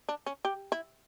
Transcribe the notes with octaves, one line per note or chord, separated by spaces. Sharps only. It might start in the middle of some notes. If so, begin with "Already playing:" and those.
D4
C#4
G4
E4